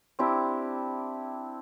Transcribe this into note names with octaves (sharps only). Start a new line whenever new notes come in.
C4 D4 E4 G4